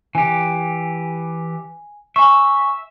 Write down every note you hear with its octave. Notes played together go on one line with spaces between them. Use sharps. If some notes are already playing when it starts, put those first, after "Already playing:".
E3 G4 G#5
E5 G#5 C#6